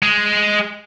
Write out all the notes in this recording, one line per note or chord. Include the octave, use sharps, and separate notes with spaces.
G#3